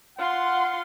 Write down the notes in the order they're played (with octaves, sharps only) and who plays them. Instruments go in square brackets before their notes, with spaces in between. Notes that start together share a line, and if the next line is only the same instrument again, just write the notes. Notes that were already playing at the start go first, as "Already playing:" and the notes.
[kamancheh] F4 C6 [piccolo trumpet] F#5